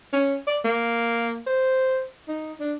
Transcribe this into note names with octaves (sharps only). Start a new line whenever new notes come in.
C#4
D5
A#3
C5
D#4
D4